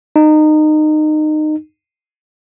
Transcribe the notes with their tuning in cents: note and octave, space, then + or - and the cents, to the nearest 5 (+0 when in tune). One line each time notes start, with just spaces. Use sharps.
D#4 -25